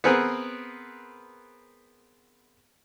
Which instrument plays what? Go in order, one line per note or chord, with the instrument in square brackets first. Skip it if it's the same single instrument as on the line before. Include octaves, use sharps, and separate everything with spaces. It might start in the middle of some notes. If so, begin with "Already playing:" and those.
[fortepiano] B3 C4 G#4 A#4 B4